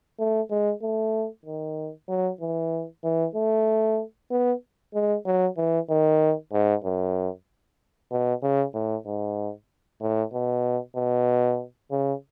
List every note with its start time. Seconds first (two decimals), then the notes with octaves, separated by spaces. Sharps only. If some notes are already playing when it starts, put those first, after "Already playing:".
0.19 A3
0.51 G#3
0.82 A3
1.45 D#3
2.09 F#3
2.41 E3
3.04 E3
3.35 A3
4.31 B3
4.94 G#3
5.25 F#3
5.57 E3
5.90 D#3
6.53 G#2
6.84 F#2
8.12 B2
8.43 C#3
8.74 A2
9.06 G#2
10.01 A2
10.33 B2
10.96 B2
11.91 C#3